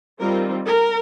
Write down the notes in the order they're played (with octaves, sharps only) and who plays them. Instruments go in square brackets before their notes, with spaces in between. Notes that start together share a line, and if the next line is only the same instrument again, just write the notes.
[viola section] D#3 G3 C4 F4 A#4
A#4